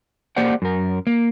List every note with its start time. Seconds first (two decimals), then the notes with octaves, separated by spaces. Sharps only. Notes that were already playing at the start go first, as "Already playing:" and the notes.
0.36 A#3 G4 C5 D5 F#5
0.62 F#2 A#4
1.07 A#3